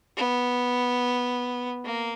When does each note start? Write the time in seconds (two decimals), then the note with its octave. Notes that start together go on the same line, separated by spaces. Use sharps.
0.17 B3
1.85 A#3